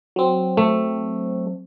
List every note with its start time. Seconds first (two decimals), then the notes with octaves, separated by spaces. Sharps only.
0.16 F#3 C4
0.57 A3